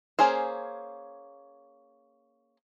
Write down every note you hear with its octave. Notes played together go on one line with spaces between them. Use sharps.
A#3 C#4 G#4 C5